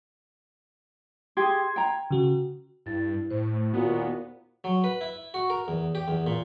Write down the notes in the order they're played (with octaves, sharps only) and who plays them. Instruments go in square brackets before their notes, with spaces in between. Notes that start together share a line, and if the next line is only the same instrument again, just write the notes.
[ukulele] G4 G#4 [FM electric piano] C6 G#6
[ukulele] G5 A#5
[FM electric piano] C#3 F#4
[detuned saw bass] G2 [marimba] E4 A6
[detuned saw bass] A2 [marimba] C5
[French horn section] D#2 A#2 F#4 [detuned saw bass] B3
[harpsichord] F#3
B4
E4
F#4
A#4
E2
G4
E2
A#2